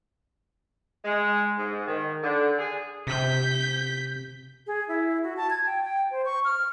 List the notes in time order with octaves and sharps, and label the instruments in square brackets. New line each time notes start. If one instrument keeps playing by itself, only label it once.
[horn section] G#3
G#2
D#3
D3
G#4
[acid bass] C3 [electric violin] G6 B6
[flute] G#4
E4
F#4
A5
G#6
G5
G5
C5
C#6
F6